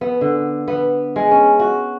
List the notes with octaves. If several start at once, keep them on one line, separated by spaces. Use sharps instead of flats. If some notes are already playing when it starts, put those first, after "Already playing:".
B3
D3
B3
G#3
C#4
F#4